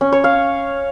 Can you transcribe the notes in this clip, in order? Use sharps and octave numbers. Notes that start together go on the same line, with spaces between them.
C#4
C#5
F5